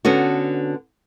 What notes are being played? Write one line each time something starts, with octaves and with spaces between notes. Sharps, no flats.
D3 B3 C#4 F#4